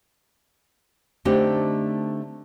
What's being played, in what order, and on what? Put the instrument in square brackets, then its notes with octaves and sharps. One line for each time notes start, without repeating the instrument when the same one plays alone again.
[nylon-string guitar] D3 A3 C4 D4 D#4 G4